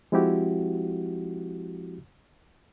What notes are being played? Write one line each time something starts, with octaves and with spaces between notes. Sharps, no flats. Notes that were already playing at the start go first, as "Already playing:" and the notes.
F3 G#3 C4 E4 F#4 G4